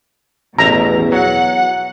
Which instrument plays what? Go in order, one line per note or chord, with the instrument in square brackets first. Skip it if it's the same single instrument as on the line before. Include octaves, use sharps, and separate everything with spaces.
[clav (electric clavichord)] A1 E5 A5 [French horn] E2 [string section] B2 [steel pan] A#5
[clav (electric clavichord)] F#3 [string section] F#5